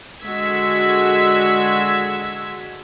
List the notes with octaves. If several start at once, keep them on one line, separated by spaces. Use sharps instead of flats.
D3 G#3 F#4 E6 G#6 B6